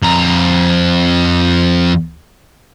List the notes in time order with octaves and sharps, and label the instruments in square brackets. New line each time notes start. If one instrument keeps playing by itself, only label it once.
[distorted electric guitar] F2 A#5